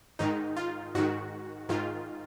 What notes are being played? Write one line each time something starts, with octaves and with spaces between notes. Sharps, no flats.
G#2 D#3 D#4
F4
G#2 D#3 F#4
G#2 D#3 F4